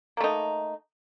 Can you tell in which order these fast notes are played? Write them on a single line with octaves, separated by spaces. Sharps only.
A#3 A3 D#4